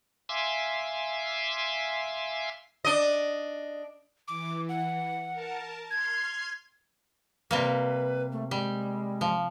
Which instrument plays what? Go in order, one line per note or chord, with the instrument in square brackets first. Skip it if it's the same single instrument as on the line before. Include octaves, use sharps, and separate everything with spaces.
[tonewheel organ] E5 F5 G#5 C6 D6 E6
[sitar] D4 D#5
[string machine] E3 [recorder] D6
[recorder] F#5
[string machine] A#4 A5
[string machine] C6 F6 C7 [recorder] G#6
[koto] C3 G3 A#3 [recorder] B4
[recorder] A3
[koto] G3 [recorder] G#3
[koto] F3